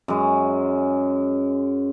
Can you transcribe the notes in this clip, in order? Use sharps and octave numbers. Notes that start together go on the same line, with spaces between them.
F#2 G#3